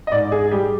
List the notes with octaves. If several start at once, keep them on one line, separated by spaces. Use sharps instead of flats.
D#5
G#2 D5
G#4
G3 G4